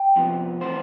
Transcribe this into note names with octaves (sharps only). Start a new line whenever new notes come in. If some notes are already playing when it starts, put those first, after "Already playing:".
Already playing: G5
F2 C3 F3 B3
A2 E3 B3 C5